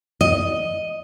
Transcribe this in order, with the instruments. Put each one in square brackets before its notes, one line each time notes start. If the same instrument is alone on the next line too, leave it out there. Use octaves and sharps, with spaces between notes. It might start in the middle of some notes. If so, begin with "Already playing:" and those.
[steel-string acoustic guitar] D#5